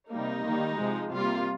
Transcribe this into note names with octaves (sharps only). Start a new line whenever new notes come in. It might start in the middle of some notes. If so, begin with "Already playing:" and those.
C3 G3 A#3 D#4
D#3 G3 A#3
C3 F3 G#3
C3 G3 A#3 F4